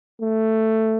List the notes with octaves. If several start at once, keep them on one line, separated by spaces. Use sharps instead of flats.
A3